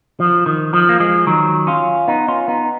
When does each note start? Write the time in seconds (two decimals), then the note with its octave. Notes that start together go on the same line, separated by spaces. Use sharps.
0.20 F3
0.46 D#3
0.74 F3
0.89 A#3
1.00 F3 G#3
1.27 D#3 F#3
1.67 C#4 F4
2.08 B3 D#4
2.28 C#4 F4
2.48 B3 D#4